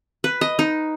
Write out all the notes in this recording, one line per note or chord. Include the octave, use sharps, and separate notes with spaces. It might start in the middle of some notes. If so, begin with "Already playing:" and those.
B4
D#5
D#4